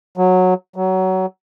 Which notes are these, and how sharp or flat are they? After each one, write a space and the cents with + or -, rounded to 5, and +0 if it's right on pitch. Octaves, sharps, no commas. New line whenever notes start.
F#3 -10
F#3 +20